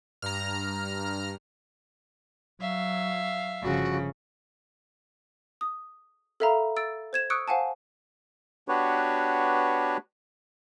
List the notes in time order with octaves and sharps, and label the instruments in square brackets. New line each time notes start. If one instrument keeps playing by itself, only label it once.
[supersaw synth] G2 [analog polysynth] A#5 F6
[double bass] F#3 [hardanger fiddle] E5 F5
[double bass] G1 F3 [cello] C#3 [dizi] F#4
[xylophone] D#6
A4 A#4 E5 F5 A#5 B5
E6 A6 D7
C5 G#6 E7
C#6 D#6 E6 F#6 C#7 D7
C5 F5 F#5 G#5 A5
[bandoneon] B3 D4 F#4 G4 B4 C#5